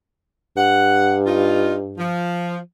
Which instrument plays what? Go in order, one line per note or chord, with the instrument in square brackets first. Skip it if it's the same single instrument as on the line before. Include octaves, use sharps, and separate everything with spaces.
[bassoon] G2 [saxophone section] F#5
[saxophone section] D#4 F4
F3